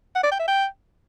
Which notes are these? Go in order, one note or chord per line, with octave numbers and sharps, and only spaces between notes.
F#5
D5
G5
E5
G5